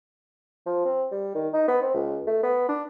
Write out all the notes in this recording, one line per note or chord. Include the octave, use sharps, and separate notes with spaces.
F3
C4
G3
D#3
D#4
B3
C4
C#2
A3
B3
D4